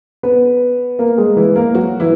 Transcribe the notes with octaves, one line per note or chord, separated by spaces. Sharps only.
B3 B4
A#3 A#4
G#3 G#4
E3 E4
A#3 A#4
F#3 F#4
E3 E4